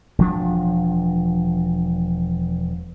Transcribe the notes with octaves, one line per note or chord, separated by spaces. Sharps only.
E1 F3 D4